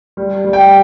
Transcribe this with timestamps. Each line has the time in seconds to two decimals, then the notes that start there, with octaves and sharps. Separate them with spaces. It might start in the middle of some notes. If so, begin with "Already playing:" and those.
0.17 G3
0.44 G3
0.53 G5